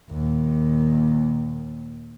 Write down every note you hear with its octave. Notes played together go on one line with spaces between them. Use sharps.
D#2 A#2